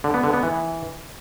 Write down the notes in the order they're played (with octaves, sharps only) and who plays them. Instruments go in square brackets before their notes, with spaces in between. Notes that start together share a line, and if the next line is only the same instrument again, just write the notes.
[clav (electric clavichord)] D3
B3
D3
B3
E3